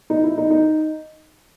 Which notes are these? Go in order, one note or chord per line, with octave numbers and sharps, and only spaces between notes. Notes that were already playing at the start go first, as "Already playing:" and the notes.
D#4
E4
D#4
D#4